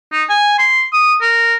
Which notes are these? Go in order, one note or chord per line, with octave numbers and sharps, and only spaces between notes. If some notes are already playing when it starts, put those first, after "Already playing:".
D#4
G#5
C6
D#6
A#4